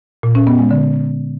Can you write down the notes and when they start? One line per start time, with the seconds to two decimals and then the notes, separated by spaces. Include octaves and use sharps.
0.23 A#2
0.35 C#4
0.47 B3
0.59 G#3
0.71 D3